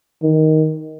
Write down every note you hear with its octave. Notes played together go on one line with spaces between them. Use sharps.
D#3